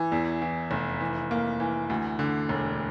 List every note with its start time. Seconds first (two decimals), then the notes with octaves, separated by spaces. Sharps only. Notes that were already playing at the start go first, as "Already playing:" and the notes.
Already playing: E3
0.12 E2
0.42 E3
0.71 F1
1.01 E3
1.31 A#3
1.60 E3
1.90 D2
2.19 D3
2.49 E1